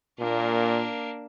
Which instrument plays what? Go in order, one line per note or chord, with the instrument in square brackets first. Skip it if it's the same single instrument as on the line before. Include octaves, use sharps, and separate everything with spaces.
[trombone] A#2 [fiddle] A#3 D4